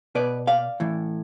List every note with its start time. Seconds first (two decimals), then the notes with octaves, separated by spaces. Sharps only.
0.15 B2 B4 D5
0.47 D5 F5
0.80 A2 E3